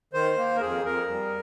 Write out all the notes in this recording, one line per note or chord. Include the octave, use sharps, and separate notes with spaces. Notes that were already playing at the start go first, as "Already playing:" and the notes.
D#3 C5
A#3
A#4
F2 G#4
F2 A#4
G3